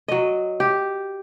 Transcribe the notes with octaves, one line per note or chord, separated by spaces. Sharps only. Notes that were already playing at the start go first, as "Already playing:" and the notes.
F#3 D#5
G4